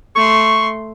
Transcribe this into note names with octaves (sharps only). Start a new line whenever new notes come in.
A3 C6 C#6